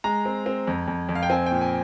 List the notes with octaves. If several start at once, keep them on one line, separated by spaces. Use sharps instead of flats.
G#3 A#5
C4
C4
F2
F2
F2
F5
G5
C4 G#5
A#2 G5
G#5